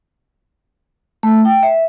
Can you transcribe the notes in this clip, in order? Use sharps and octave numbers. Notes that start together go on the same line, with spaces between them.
A3
G5
E5